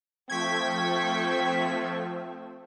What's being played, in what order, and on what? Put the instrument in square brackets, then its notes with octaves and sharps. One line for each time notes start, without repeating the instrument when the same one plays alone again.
[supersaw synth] F3 A3 [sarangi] C4 [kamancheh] G5 C#6 [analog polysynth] G#6 B6